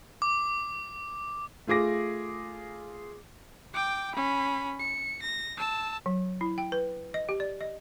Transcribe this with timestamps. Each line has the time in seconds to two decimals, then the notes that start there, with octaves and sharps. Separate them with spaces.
0.22 D6
1.67 A3 F4 G#4 D6 A#6
3.74 G5 D6
4.15 C#4 B5
4.79 C#7
5.22 A#6
5.57 A5 E6
6.06 F#3
6.41 E4
6.58 G5
6.72 B4
7.14 D#5
7.29 G4
7.40 D5
7.61 D#5